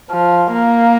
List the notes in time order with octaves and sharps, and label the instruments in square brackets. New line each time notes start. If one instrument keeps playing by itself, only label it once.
[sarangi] F3
A#3